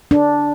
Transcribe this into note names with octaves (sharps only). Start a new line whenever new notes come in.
D4